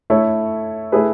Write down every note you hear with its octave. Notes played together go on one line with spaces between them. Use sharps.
A3 E4 A4 C#5
A3 E4 G#4 B4